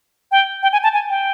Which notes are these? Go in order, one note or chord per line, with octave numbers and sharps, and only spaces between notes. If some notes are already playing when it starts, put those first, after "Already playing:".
G5
G5
G#5
A5
G#5
G5